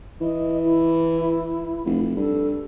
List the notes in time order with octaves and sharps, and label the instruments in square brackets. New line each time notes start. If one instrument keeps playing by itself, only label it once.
[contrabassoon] E3 [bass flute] D#5
[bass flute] E4
[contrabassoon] F1
[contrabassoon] G2 [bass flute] A4